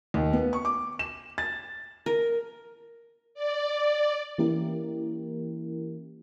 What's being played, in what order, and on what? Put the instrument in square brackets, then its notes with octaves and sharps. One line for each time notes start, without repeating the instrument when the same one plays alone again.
[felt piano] D#2
B3
C#6
D6
E7
A6
[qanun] A#4
[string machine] D5
[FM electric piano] E3 A#3 C#4 E4 G4 A#4